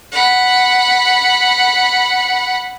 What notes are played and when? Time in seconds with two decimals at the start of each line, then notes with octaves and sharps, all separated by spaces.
0.12 F#5 B5